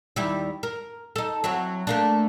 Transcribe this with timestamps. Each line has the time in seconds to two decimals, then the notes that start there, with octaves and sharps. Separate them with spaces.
0.16 D#2 G3 E4
0.63 A#4
1.16 D#4 A4
1.44 F#3 C4 E4
1.87 A3 A#3 D4